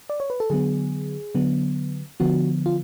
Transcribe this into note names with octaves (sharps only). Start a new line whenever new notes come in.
D5
C#5
B4
A4
D3 F#3 B3 G#4
D3 F#3 B3
D3 F3 B3 F#4
F4